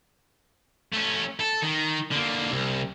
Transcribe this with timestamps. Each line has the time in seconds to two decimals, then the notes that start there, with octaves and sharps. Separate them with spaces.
0.94 A3 C#4
1.40 A4
1.62 D#3
2.11 D3 A#3
2.51 C2